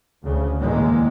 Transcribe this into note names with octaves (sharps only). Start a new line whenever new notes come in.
D2 C#3
E2 A2 D#3 G#3 A#3